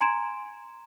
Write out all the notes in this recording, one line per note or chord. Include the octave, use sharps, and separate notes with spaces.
G#5 A#5 C6 G#6 D7 E7